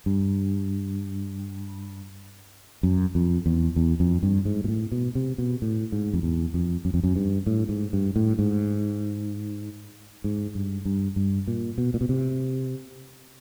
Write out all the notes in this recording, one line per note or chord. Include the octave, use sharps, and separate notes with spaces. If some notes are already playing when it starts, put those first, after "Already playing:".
G2
F#2
F2
E2
E2
F2
G2
G#2
A#2
A2
B2
C3
B2
A2
G#2
F2
E2
F2
F#2
F2
F#2
G2
A2
G#2
G2
A2
G#2
G#2
G2
G2
G2
A#2
B2
A#2
B2
C3